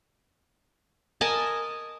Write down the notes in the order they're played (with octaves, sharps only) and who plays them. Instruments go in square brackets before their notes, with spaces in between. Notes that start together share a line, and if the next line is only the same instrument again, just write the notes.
[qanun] A#4 D#5 G#5 A5